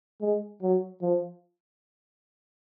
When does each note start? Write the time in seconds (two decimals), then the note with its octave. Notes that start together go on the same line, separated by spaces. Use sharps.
0.21 G#3
0.62 F#3
1.01 F3